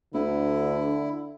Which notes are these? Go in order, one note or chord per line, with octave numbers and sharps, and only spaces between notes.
D2 D3 E4